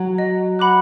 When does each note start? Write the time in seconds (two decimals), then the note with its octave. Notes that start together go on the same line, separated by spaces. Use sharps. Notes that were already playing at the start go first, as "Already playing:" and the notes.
Already playing: F#3
0.18 D#5
0.59 F#5 B5 D6 F#6